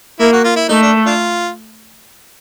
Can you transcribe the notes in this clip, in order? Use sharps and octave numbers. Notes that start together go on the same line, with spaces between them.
A#3 E4
F#4
F4
E4
A3 D#4
D4
D4 F4